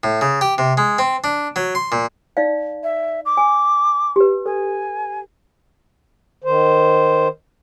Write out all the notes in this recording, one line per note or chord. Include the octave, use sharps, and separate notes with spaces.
A2
C#3
G4
C3
G#3
C4
D4
F#3
C6
A#2
D#4 D5 F5
E5
D6
G#5
G4 B4
A4 G#5
D#3 C5